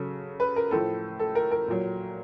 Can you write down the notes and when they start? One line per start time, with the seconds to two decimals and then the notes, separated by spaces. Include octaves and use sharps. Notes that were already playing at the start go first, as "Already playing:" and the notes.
Already playing: C#3 F#3 A4
0.40 B4
0.56 A#4
0.71 A2 F3 A4
1.19 A4
1.35 A#4
1.51 A#4
1.68 A#2 F#3